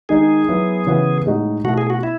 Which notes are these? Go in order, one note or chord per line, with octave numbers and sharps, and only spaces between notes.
D#3 G#3 D#4 G#4
F#3 B3 E4
C#3 E3 B3 F#4
A2 G#3 D#4 F#4
B2 A3 E4 F#4
G#4
F#4
E4